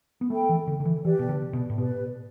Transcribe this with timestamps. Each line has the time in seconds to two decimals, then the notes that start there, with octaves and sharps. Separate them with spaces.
0.21 B3
0.30 A3 A4 G5 B5
0.49 E3
0.67 D3
0.80 D3
0.85 E3
1.04 E3 G4 B4 D5
1.19 B2
1.29 D3
1.53 B2
1.70 A2
1.78 B2 G4 B4 D5